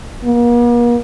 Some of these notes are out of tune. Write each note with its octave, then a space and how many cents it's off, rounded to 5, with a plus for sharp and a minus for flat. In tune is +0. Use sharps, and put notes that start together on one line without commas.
A#3 +45